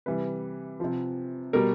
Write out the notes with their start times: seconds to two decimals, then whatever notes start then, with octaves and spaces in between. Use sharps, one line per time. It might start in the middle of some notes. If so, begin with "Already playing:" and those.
0.06 C3 E3 G3 B4
0.80 C3 F3
1.53 B2 G3 A#4